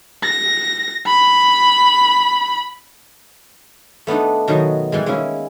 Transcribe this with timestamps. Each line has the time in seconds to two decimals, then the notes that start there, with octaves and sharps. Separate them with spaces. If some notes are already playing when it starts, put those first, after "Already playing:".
0.24 A#6
1.07 B5
4.07 A3 B3 D4 D#4
4.48 B2 D#3 F#3
4.92 E3 G3 G#3
5.06 G#3 A#3 C#4 E4 E5